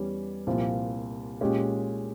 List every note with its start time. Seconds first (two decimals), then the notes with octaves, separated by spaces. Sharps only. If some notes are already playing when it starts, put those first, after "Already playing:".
Already playing: E2 E3 G3 C#4 G4
0.47 C2 A#2 F3 C4 F4
1.41 A#2 G#3 C#4 G4